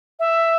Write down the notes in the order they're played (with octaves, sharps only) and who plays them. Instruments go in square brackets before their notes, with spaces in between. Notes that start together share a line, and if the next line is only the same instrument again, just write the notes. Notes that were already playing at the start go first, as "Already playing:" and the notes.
[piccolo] E5